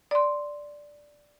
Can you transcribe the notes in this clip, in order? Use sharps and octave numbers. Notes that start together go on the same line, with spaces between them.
D5 C6